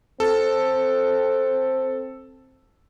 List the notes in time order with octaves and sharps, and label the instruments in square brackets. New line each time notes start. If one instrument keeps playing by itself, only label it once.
[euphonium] C4 [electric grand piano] A4